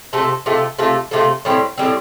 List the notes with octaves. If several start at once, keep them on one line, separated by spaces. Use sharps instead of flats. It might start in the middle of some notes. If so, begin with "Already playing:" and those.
C3 A3 F4 A4
C3 A3 F4 A4
C3 A3 F4 A4
C3 A3 F4 A4
A2 G3 C4
A2 G3 C4